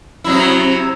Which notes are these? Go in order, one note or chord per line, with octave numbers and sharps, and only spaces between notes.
C3 F#3 E4